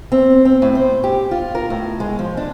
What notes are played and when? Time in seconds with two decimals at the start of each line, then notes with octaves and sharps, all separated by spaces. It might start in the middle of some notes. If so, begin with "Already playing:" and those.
0.12 C4
0.45 C4
0.62 A2
0.75 C5
1.04 G4
1.31 F4
1.55 A#4
1.70 A2
2.00 G#3
2.19 F3
2.37 D4